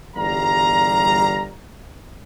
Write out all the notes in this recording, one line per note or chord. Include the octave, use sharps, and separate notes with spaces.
G1 E2 G3 F5 A#5